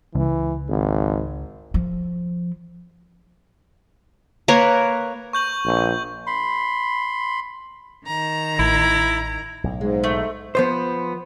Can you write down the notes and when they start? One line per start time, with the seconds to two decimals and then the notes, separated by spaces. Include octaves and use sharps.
0.15 C#2 E3
0.68 G#1
1.74 F3
4.48 A#3 A#4 B4 C#5
5.33 C#6 G6 F#7
5.66 A#1
6.27 B5 C6
8.06 D#3 A#5
8.59 A1 E4
9.64 B1 A2
9.81 G#2 G#3
10.04 A3
10.55 F3 B3 C5